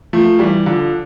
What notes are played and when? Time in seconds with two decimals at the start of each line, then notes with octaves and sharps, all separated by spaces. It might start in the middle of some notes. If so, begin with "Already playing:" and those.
0.13 F3 A3
0.39 E3 G3
0.66 D3 F3